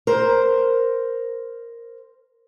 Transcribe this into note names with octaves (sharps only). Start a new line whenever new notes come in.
A#4 C5